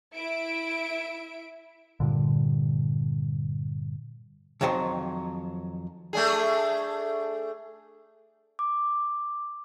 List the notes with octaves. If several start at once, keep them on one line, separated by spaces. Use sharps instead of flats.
E4 E5 D7
G2 A#2 D3
F2 D#3 F#3 C5 D#5 C6
A3 D4 G#4
D6